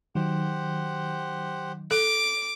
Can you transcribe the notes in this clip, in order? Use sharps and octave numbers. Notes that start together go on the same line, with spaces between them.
D#3 F#3 G4 C5 F#5
A4 D6